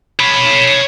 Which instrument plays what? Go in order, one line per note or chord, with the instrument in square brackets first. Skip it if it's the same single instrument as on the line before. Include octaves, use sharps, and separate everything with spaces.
[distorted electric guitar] C#5 B5